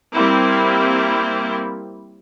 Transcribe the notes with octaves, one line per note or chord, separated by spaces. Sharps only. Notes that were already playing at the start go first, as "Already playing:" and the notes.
G3 A#3 C4 E4